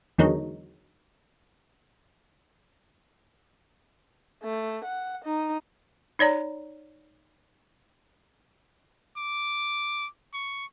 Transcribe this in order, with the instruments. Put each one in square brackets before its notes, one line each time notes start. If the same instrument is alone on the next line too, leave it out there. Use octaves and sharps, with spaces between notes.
[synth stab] E2 D3 D#3 F#3 G#3 D#4
[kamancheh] A3
F#5
D#4
[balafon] D#4 C#5 D5 A#5
[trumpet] D6
C#6